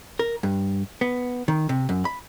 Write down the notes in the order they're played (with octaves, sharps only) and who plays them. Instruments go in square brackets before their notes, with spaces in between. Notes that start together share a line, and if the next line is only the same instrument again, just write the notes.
[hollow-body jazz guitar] A#4
G2
B3
D#3
C3
F#2
B5